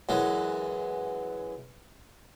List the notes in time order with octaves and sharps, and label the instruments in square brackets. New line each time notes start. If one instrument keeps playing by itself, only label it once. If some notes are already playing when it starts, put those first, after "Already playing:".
[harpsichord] F#2 E3 F#3 G#3